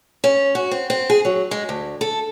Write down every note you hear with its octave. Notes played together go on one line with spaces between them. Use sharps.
C#4
F#4
C4
C4
G#4
F#3
G#3
D2
A4